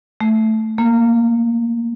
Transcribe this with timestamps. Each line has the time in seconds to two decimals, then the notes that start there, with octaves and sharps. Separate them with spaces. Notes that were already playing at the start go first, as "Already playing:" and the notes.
0.21 A3
0.78 A#3